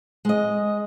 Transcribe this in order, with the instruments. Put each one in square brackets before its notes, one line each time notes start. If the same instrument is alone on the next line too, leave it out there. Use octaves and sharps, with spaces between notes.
[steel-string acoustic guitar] G#3 D#5